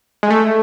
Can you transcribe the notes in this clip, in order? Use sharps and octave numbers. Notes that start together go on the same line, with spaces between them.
G#3
A3